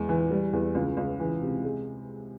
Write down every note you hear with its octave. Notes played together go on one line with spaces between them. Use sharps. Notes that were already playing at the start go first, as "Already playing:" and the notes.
Already playing: E2 G#3
E3
G3
E2
C#2
C#2
E3
C3
G#3